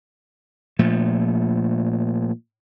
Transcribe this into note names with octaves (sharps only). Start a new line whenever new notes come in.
A#2 F3 A3